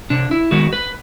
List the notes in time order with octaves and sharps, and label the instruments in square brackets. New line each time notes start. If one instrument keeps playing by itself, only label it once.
[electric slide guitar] C3 D4
E4
D#3 G#3 B3 F#4
B4